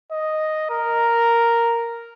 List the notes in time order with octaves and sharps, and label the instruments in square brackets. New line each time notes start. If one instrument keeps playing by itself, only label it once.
[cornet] D#5
A#4